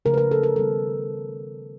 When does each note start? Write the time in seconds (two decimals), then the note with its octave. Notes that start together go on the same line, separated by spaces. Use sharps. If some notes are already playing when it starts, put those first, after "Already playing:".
0.05 C#3 F3 A3 A#4
0.14 B4
0.18 A#4
0.31 A4
0.43 A#4
0.55 D#3 G3 B3 A4